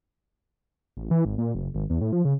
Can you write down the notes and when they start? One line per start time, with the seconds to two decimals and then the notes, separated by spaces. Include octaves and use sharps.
0.97 A1
1.11 E3
1.25 G#1
1.38 A#2
1.55 F#1
1.75 G#1
1.90 E2
2.01 A2
2.12 F3
2.25 C#3